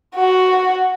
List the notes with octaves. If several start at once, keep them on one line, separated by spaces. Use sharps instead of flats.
F#4